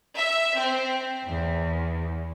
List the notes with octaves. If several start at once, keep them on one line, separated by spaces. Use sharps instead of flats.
E5
C4
E2